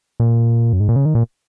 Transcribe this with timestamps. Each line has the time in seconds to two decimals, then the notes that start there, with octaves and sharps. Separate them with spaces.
0.20 A#2
0.73 F#2
0.80 G#2
0.89 A#2
0.96 C#3
1.05 D#3
1.15 A#2